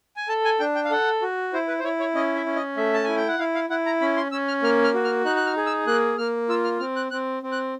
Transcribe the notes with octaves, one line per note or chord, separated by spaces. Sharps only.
G#5
A4 A5
G#5
D4 G5
G5
F5
A4 F#5
F#4
E4 C5
B4
C5
E4 C#5
C#5
C#4 D#5
E5
C#4
D#5
A3 E5
A5
E4 G#5
G5
F#5
E4 F5
F5
E4 F#5
A#5
C#4 B5
C6
C#4 E6
F6
A#3 F6
F6
F#4
F6
D#4 F#6
F#6
F6
G#4
E6
A#3 F#6
A#3 F6
F4 E6
F6
C4 F6
F#6
C4 F#6
C4
F#6